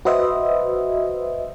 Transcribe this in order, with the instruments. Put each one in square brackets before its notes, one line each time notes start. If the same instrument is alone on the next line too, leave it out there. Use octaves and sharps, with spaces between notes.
[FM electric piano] F#4 B4 C5 D#5 E5